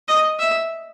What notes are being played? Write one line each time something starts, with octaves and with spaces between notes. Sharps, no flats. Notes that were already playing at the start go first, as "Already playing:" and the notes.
D#5
E5